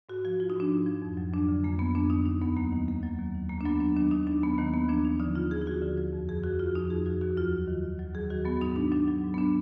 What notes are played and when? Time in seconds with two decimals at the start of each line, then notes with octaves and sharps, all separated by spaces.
0.09 G#2 F#4
0.25 F3 F#4
0.40 F3 F4
0.50 D#4
0.55 G#2 D4
0.72 G#2
0.86 F3
1.02 F2
1.17 F#3
1.33 F2 D4
1.48 D3
1.64 F2 A#3
1.79 F#3 B3
1.95 F2 D4
2.10 D3 D#4
2.26 D#2 D#4
2.42 F#3 B3
2.56 D#2 A#3
2.72 D#3
2.88 D#2 A#3
3.03 F#3
3.19 D#2
3.34 D#3
3.49 D#2 A#3
3.61 D4
3.65 F#3 B3
3.80 D#2 D4
3.96 D#3 D4
4.11 D#2 D#4
4.27 F#3 D4
4.42 D#2 B3
4.58 D#3 A#3
4.73 D#2 B3
4.89 F3 D4
5.05 D#2 D#4
5.20 D3 D#4
5.35 D#2 F4
5.51 F3 G#4
5.61 F4
5.67 D#2 F#4
5.82 D3
5.98 F3
6.13 F2
6.28 F2 G#4
6.43 F3 F#4
6.59 F3 F4
6.75 F2 D#4
6.90 F2 G#4
7.06 F3 F#4
7.21 D#2 F#4
7.37 F#3 F4
7.52 D#2
7.68 D#3
7.83 D#2
7.99 F#3
8.14 D#2 G#4
8.30 D#3 F#4
8.45 F#3 B3
8.61 G#2 D#4
8.76 G#2 D4
8.92 F#3 D4
9.08 F#3
9.23 G#2
9.34 B3
9.38 D4